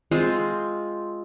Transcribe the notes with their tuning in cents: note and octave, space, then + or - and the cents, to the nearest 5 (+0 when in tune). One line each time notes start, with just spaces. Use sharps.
G#3 +0 C4 +0 F4 +0